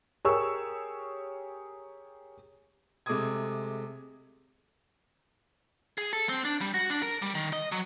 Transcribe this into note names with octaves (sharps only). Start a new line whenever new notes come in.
G4 G#4 A#4 C#5 C#6 E6
C3 G#3 A3 D6 D#6 G#6
G#4
A4
C4
D4
G3
F#4
D4
A#4
G3
D#3
D#5
F#3